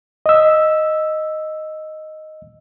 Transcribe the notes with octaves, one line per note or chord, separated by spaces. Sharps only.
D#5 E6